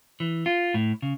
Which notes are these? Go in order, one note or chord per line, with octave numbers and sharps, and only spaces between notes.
E3
F4
A2
C#3